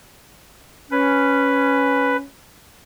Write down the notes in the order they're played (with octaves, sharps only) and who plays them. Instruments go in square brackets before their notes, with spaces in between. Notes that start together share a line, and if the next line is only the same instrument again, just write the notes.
[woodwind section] C#4 [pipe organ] B4